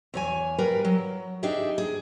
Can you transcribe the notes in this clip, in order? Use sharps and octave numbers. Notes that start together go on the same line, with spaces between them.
E2 C#5 G#5
G3 A#4 B4 F5
F#3
D4 D#4 G4 G#4 E5
G#4